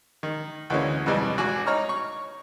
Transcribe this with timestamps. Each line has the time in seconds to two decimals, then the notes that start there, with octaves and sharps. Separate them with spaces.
0.23 D#3
0.70 D2 E3 G#3 A#3 C#4
1.06 F2 B2 E3 G3 G#3
1.37 G#1 F#4 G#5 D6
1.67 D#4 C#5 A#5 C#6 F6
1.89 C#6